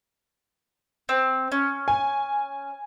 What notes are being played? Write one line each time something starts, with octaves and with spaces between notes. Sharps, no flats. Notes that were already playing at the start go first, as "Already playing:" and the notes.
C4
C#4
G#5